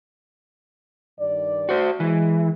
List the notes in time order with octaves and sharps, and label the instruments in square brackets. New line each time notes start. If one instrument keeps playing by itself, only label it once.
[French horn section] G2 D#3 D5
[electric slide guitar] F#4 C5
[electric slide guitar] E3 [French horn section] G#3